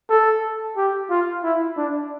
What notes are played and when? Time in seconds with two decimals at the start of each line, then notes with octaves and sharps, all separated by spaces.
0.10 A4
0.77 G4
1.10 F4
1.43 E4
1.77 D4